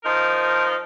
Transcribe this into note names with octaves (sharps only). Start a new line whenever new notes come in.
F3 D#4 A#4